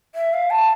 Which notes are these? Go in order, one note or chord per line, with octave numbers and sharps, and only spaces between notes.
E5
F5
A5